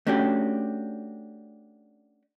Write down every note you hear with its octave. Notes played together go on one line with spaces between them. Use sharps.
A3 C#4 D4 F#4 G4